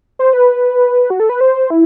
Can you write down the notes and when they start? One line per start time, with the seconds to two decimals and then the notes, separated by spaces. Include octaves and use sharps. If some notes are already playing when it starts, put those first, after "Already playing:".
0.19 C5
0.33 B4
1.10 F#4
1.20 A4
1.29 B4
1.41 C5
1.70 E4